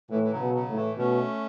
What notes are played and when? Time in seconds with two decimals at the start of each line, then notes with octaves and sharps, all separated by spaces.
0.10 A2 E3
0.23 E3
0.31 C#3 F#3
0.39 B2
0.54 C#3 F#3
0.69 A2
0.75 E3 A3
0.97 B2 A3 C#4